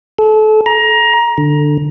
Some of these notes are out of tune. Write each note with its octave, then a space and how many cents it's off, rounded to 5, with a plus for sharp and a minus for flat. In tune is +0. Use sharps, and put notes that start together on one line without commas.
A4 -30
A#5 +20
D3 +15